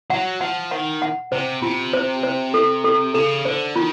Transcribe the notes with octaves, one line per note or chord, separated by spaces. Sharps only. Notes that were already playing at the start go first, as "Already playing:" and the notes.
F#3 F#5
F3 F#5
D#3 F#5
F#5
C3 C5
C3 F4
C5
C5
A4
A4
C#3 A4
D3 C5
D#3 F4